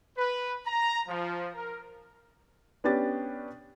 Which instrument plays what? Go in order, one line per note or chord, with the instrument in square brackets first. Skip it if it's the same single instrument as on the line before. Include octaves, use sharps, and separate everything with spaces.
[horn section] B4
A#5
F3
A#4
[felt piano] B3 C#4 D4 G4 A6